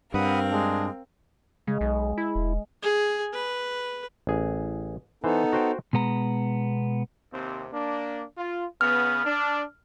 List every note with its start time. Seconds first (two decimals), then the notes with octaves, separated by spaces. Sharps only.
0.14 G2 C4 A#4 F5 F#5 B5 D#6
0.51 G#3 D4
1.67 C#3 G#3
1.81 B1
2.18 E4
2.35 E1
2.83 G#4
3.33 B4
4.27 A1 G#4
5.24 E3 B3 D#4 A4 C5
5.53 F#4 C5 G5
5.93 B2 G#3 B3 A#5
7.33 D#2 C3 C4
7.73 A#3 D4
8.36 F4
8.81 C#3 B3 F6
9.25 D4